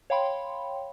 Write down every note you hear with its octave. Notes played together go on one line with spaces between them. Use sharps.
C#5 F5 G5 B5 C6